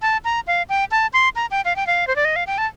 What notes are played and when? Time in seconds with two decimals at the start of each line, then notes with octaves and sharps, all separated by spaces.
0.02 A5
0.25 A#5
0.47 F5
0.69 G5
0.91 A5
1.13 C6
1.36 A#5
1.51 G5
1.65 F5
1.76 G5
1.87 F5
2.07 C5
2.16 D5
2.25 D#5
2.36 F5
2.47 G5
2.58 A5